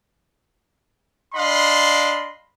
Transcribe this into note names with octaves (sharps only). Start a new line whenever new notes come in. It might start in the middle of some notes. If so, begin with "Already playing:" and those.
D4 D#5 F5 B5 C6